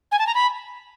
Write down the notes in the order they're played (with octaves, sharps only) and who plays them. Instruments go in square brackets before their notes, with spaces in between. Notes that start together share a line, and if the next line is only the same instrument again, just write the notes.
[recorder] G#5
A5
A#5
B5